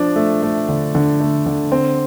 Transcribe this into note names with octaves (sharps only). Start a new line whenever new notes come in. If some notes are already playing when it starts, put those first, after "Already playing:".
Already playing: F3 D4
A3
A3
D3
D3
A3
D3
C4